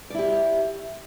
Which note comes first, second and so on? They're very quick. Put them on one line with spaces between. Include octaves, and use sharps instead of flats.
D5 E4 G4